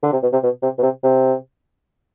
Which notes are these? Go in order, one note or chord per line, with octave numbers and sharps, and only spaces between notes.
D3
C3
B2
C3
B2
C3
B2
C3
C3